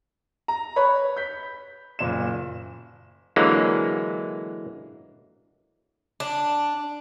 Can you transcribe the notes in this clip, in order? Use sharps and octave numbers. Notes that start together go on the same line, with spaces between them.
A#5
B4 C#5 B5
G6 B6
F#1 A#2 E7
D3 E3 F#3 G#3 A#3
D4